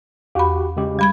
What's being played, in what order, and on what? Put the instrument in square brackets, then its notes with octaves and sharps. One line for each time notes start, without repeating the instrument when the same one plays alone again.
[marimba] E2 B5 [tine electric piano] F#4 G4
[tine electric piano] C#3 G#3 G4
[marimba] G3 B5 G#6